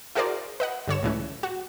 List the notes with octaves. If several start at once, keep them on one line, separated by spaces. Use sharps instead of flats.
E4 F#4 G#4 A#4 C5 D5
B4 D#5 F#5
G2 D3 C#5 E7
C#2 A2 E3 C#4
F#4